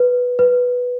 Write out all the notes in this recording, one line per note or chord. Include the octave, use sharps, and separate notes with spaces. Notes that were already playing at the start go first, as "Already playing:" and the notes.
Already playing: B4
B4